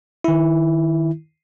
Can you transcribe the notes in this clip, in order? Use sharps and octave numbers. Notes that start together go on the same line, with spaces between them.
D#3 E4